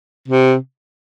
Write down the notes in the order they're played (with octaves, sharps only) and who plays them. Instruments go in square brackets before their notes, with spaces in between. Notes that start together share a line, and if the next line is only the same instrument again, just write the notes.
[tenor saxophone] C3